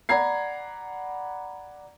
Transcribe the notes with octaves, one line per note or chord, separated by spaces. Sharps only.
D5 F#5 A#5 B5 G#6 C7